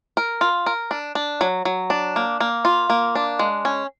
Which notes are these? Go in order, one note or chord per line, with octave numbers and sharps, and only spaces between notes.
A#4
F4
A#4
D4
D4
F#3
F#3
D4
A#3
A#3
F4
A#3
D4
G#3
C#4